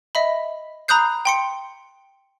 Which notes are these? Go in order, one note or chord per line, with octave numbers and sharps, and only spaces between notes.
D#5 E5 B5
A#5 B5 D#6 F#6 G6 C7
G5 C6 C#7